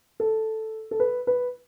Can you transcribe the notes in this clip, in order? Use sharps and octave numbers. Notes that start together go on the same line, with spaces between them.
A4
A4
B4
B4